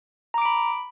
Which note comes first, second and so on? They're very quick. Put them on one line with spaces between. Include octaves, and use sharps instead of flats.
A#5 D6 D7 B5